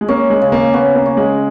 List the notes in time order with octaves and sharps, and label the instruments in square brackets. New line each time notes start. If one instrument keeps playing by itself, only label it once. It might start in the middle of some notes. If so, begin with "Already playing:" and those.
[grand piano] G#3
[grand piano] A#3 [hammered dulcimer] C#4
[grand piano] G#3
[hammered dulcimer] C#3
[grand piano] A#3
[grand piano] B3 [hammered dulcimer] C#4
[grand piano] A#3
[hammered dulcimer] C#4
[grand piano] G#3